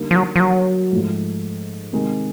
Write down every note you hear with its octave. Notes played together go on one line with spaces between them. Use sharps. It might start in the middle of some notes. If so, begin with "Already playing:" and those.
Already playing: D3 G3 A#3 D#4
F3
F#3
F3
F#3
G#2 F3 A3
C3 D#3 G#3